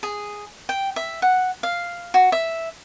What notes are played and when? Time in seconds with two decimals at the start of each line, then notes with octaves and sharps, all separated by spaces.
0.03 G#4
0.69 G5
0.96 E5
1.22 F#5
1.63 F5
2.14 F#4
2.32 E5